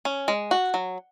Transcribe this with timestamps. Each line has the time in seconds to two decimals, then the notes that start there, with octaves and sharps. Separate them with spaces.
0.05 C#4
0.28 G#3
0.51 F#4
0.74 F#3